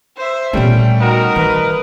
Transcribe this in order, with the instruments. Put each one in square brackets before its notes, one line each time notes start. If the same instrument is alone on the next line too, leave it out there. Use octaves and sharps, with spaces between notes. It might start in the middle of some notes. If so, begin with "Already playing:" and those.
[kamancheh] C5 E5
[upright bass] A#2 B3 [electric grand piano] G3 A3 C#4 [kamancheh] G5
[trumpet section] D#4 A#4 [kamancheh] F#4
[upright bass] D#3 [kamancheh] B4